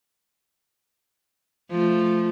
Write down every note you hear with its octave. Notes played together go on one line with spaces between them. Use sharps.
F3 A3